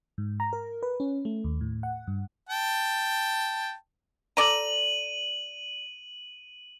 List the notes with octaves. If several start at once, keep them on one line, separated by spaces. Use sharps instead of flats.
G#2
A#5
A#4
B4
C#4
A3
D#2
A2
F#5
G2
G5 A5
A4 D5 A#5 D#7 F#7